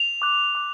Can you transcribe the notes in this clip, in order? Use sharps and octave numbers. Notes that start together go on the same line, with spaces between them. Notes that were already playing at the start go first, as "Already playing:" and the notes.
Already playing: F7
D6 F#6
D6 F#6